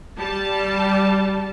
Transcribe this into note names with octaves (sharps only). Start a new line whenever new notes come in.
G3 A5